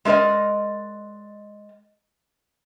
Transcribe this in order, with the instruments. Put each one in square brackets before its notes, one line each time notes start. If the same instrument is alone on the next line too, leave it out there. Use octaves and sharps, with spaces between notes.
[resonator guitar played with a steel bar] G#3 A3 A#4 D5 D#5